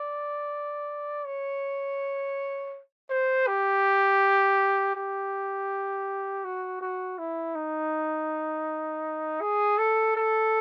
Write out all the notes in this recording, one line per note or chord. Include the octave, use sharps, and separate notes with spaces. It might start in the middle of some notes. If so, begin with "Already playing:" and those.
Already playing: D5
C#5
C5
G4
G4
F#4
F#4
E4
D#4
G#4
A4
A4